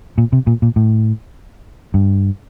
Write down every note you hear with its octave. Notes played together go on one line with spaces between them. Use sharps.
A#2
C3
A#2
A#2
A2
G2